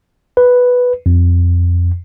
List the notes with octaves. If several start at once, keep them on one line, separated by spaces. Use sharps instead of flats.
B4
F2